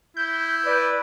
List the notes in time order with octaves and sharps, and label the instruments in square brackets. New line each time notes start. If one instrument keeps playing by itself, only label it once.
[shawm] E4 [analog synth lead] G6
[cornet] B4 [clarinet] D5